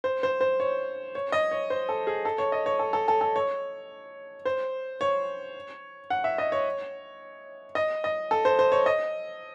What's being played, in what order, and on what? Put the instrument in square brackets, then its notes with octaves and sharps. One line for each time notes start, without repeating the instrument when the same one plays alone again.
[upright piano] C5
C5
C5
C#5
C#5
D#5
C#5
C5
A4
G#4
A4
C#5
D#5
C#5
A4
A4
A4
A4
C#5
C5
C#5
F#5
E5
D#5
C#5
D#5
D#5
A4
C5
C5
C#5
D#5